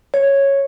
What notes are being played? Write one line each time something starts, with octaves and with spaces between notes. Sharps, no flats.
C#5